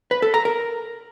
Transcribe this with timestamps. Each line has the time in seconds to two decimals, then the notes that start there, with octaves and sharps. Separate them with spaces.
0.11 B4
0.22 A4
0.34 A#5
0.45 A#4